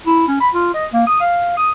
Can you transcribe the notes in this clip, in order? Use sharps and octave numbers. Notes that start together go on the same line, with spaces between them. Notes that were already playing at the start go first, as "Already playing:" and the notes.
E4
C#4
B5
F4
D#5
A#3
D#6
F5
D#6